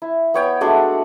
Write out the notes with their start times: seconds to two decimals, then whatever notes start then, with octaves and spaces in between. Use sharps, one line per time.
0.02 E4
0.34 B3 C#5 G5
0.61 G#3 A3 D4 F#4